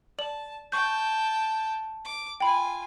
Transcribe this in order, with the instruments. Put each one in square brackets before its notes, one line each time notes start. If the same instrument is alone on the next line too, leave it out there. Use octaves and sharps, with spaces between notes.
[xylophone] D5 F#7 [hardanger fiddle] A5
[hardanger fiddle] G5 A5 [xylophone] C#6 G6
[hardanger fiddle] D6
[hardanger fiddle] F4 G#5 [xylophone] G5 B5